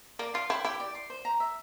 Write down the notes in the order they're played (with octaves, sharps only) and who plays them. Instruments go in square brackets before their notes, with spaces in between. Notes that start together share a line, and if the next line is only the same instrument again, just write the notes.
[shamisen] A#3 [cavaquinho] D5
[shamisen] F4 [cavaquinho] C6
[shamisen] E4 [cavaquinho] G5
[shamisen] E4 [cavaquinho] G4
[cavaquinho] D5
C6
C5
A#5
E5